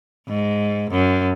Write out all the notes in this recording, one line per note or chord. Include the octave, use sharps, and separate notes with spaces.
G#2
F#2